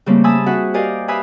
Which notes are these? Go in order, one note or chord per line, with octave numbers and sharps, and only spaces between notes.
C#3 G3 A3 A#3 C4
E5 G#5 A5 B5 D#6 E6
C4 F#4 G#4 E5 F#5
G4 A#4 D5 D#5 F5 G#5
B4 E5 F5 G#5 B5 D#6